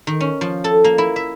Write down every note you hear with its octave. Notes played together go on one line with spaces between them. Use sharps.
D#3
C#4
F3
A4
A#3
E4
E5